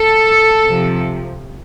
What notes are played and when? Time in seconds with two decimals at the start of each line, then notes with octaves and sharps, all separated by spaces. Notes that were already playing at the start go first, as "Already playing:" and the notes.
Already playing: A4
0.66 C3 F3